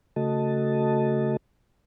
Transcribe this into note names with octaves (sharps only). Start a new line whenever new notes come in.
C#3 A3 F#4 A4 D#5 A5